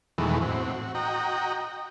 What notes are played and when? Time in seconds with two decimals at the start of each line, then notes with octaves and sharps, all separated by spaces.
0.18 E2 B2 D#3 E3 G#3 A3
0.42 A2 C4 F#4
0.74 F#4
0.95 F#4 D#5 G5 A#5